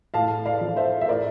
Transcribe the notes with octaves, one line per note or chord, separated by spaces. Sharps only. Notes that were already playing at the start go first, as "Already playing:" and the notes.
A2 F5 A5
D5 F5
F3
C5 E5
E5
A2 A#4 D5